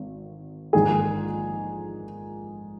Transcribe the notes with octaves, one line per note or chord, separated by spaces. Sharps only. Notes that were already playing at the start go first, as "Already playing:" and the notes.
Already playing: G#1
A#1 G#2 D#3 G#4